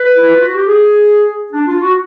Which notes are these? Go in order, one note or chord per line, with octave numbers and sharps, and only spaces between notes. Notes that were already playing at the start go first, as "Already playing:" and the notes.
Already playing: B4
E4
F4
F#4
G4
G#4
D4
F4
F#4